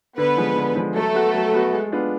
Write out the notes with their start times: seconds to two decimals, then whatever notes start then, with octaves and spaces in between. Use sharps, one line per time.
0.18 D3 B3 B4
0.37 F3 G#3
0.56 D3
0.76 F3 G#3
0.95 F#3 A3 A4
1.14 B3 F#4
1.34 F#3
1.53 B3 F#4
1.73 G#3
1.92 B3 D4 F4